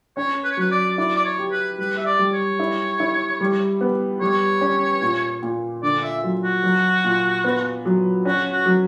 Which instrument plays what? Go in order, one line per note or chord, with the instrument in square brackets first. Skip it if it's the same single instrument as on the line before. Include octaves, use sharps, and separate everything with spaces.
[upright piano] C#4 [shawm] C#5
[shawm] B4
C#5
[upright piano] F#3 [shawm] B4
[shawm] D5
[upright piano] E4 [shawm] D5
[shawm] D5
C#5
[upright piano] G4
[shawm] B4
[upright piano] G3 [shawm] B4
[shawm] E5
D5
[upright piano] G3
[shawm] C#5
[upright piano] E4
E4
G3
B3
[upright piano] G3 [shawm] C#5
[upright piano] C#4
A#2
A#2
[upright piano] D3 [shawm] D5
[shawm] E5
[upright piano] F#3
[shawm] F#4
[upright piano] F#3
A#2
B3
F#3
[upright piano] C#4 [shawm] F#4
[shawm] F#4
[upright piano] F#3